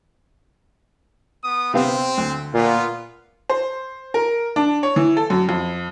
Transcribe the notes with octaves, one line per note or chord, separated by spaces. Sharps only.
B3 D#6
C3 B3 C4 F5
D2
A#2 B3 F4
C5
A#4
D4
C#5
E3
A4
F#2
F2